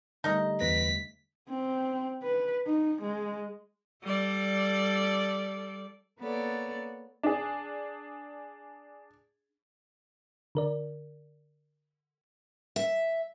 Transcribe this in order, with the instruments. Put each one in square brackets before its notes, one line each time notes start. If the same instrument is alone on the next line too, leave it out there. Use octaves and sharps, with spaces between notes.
[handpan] D3 G3 A3 [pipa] D#4 A#4 D#5
[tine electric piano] E2 B4 A#6 [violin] B6
[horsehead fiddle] C4
B4
D#4
G#3
[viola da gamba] G3 A4 D5
[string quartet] A#3 B3 A4 C#5 D5
[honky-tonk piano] D4 G#4
[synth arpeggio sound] D3 A#4 D5
[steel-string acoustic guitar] E5